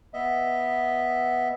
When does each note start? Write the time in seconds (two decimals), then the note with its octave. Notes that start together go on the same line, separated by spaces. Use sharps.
0.14 B3 D#5 E5